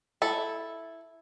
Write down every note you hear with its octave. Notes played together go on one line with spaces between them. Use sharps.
E4 A4